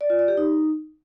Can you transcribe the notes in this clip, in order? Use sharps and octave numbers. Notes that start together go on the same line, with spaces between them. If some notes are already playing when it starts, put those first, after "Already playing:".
D5
F4
D5
G4
D#4